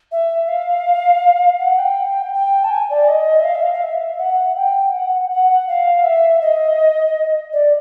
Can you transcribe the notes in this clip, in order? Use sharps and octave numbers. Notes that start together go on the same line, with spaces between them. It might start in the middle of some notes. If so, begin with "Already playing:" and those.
E5
F5
F#5
G5
G5
A5
G#5
D5
D#5
E5
F5
E5
F5
F5
E5
F#5
G5
F#5
F#5
F5
E5
D#5
D5